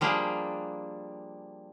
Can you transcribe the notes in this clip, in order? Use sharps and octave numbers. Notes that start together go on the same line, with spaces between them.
F3 G3 A#3 D4 G4 G#4